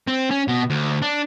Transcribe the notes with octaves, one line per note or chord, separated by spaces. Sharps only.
C4
C#4
B2
D2
D4